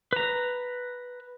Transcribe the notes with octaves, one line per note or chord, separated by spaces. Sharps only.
B4 A#5